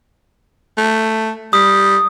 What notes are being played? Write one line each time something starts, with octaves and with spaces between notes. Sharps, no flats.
A3
G3 D#6